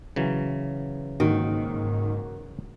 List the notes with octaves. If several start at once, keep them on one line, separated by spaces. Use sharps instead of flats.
C#3 E3 F#3
G#2 D#3 A#3 F#4